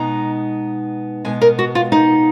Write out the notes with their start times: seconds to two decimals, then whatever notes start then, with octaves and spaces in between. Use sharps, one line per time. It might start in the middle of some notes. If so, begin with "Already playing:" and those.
Already playing: B2 G#3 B3 D#4 A#5
1.25 B2 G#3 B3 G#5
1.41 A#4
1.59 F#4
1.75 F4
1.92 D#4